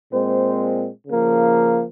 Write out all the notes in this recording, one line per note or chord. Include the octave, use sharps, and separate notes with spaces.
A#2 G#3 C4 C5
C#3 F3 A#3